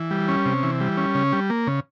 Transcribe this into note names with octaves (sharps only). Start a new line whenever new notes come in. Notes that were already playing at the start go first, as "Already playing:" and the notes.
Already playing: E3
G3
C#4
C3
E3
G3
C#4
C#3
G3
A#3
C#3